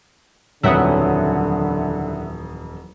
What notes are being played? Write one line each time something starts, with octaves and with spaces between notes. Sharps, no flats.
D#1 F2 D3 E3 F#3 E5 F#5 D#6